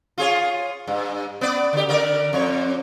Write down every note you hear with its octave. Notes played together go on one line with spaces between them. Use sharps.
F4 G#4 C#5
G2
B3 D5
D3 G4
D3 A#4 D5
F2 C#5